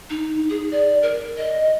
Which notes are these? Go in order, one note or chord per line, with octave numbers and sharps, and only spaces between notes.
D#4
G#4
D5
A#4
D#5